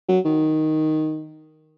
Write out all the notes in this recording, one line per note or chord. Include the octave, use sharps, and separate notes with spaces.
F#3
D#3